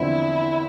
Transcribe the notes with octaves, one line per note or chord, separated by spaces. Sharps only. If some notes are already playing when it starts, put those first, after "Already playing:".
Already playing: E2 D3 F3 C4 E4